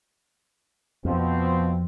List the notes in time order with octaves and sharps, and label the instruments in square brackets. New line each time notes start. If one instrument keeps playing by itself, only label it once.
[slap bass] F2 [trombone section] B2 F3 C4